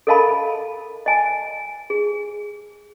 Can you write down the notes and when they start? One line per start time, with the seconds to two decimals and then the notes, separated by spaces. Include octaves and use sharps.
0.07 A4 A#4 D#5 F5 A5 B5
1.06 D#5 G#5 A5
1.90 G#4